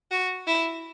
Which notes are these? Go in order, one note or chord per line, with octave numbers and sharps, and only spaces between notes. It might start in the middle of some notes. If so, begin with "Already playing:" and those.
F#4
E4